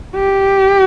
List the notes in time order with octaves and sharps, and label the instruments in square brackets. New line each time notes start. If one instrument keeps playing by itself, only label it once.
[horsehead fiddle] G4